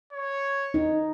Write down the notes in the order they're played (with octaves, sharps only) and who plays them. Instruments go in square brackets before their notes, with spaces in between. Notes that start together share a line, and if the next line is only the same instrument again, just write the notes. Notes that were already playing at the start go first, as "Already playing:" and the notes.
[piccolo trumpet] C#5
[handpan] D#4